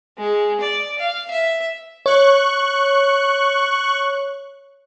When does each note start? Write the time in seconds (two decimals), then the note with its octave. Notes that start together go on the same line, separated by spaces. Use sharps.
0.18 G#3
0.60 D5
0.99 F5
1.31 E5
2.06 C#5 C#6 F#6